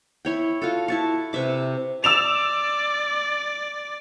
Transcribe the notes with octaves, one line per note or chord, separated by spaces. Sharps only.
E4 C#5 G5
F4 F#4 A4
E4 A5 C#6
C3 B4 E5 D6
D5 E6 E7 F7